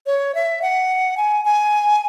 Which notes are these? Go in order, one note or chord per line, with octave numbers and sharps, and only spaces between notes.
C#5
E5
F#5
G#5
G#5